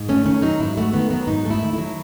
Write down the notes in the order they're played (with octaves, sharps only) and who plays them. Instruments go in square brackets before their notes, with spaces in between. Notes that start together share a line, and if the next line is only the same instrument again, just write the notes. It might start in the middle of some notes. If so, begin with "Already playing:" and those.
Already playing: [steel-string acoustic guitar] G#2
A3 C#4
D#3 C#4
F#3 D#4
G#2 E4
A3 F#4
D#3 B3
F#3 B3
G#2 D#4
A3
E4
D#3
F#3 E4